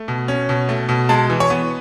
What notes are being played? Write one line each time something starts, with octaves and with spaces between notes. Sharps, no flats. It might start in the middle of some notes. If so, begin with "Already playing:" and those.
Already playing: A3
B2
C#4
B2
A3
B2
G#3 A5
E3
C#5
B3